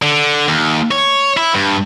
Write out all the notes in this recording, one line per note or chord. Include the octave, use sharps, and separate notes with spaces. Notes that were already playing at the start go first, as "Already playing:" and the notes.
D3
D#2
C#5
E4
G2